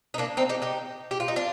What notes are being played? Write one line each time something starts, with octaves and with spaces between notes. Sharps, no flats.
D#4
A#3 D4
C4 D#4
D#4 G4
D#4 G4
G4
F4
D#4
D4 F4